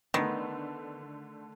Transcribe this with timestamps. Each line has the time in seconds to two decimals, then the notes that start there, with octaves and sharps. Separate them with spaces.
0.14 D3 D#3 A3 B3